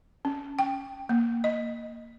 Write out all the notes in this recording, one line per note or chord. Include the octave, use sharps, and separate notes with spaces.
C#4
G5
A#3
D#5